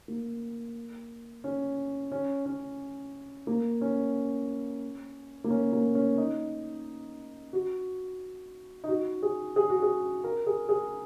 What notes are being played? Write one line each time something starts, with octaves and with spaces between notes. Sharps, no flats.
A#3
C#4
C#4
C#4
A#3
C#4
A#3
C#4
A#3
C#4
D#4
F#4
D#4
F#4
G#4
G#4
F#4
G#4
A#4
G#4
G#4